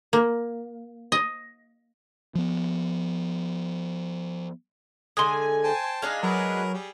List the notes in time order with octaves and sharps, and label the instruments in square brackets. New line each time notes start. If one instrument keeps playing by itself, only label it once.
[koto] A#3
D#5
[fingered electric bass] F3 B3
[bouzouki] D3 G#3 [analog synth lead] G#5 [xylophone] C6 D#6
[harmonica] C5 G5 A5
[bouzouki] G#3 D4 D#4 [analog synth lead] F5
[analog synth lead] F#3 [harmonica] G#4 A#4 B4
[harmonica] G3 G#4